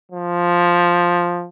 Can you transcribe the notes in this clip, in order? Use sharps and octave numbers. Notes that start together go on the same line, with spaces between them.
F3